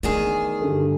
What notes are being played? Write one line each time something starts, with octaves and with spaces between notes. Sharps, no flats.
E2 D#3 A3 D4 G#4
G2 D3 A3